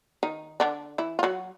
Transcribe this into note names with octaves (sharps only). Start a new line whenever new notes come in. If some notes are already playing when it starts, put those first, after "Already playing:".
D#3 D#4
D3 D4
E3 E4
F4
F#3 F#4